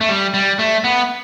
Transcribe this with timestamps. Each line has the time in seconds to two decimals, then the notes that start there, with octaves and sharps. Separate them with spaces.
0.01 A3
0.09 G3
0.34 G3
0.59 A3
0.84 B3